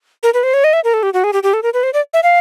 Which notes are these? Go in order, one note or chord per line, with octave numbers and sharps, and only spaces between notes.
A#4
B4
C5
C#5
D#5
E5
A#4
A4
G4
F#4
G#4
G4
G4
A4
A#4
B4
C5
D5
E5
F5